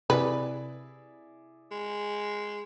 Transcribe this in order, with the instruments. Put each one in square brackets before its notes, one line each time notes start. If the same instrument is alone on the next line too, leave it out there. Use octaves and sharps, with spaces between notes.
[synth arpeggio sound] C3 [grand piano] E4 G#4 D5 [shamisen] B4
[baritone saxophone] G#3